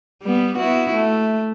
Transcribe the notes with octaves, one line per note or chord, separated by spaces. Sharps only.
G3 B3
B3 E4 F#4
A3